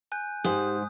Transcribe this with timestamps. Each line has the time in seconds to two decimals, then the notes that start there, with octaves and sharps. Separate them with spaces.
0.12 G#5 F#6 G6
0.45 G#2 G4 D#6